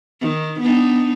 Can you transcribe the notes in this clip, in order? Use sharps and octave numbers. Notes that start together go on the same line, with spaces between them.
D#3
B3 D4 D#4